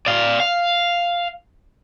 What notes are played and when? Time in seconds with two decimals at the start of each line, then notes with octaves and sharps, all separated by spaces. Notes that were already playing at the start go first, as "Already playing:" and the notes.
0.06 D5 F5
0.40 F5